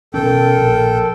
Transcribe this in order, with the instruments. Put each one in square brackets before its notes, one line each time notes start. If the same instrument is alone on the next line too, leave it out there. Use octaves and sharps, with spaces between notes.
[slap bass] B2 D#3 C#4 [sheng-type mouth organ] A4 G5 [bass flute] A#4
[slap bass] A#1